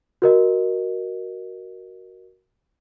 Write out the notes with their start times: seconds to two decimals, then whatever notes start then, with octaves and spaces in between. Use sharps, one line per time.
0.22 F#4 A#4 D#5